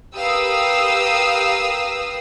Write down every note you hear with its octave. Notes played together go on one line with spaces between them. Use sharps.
G4 A#4 B4 F5 D#6 E6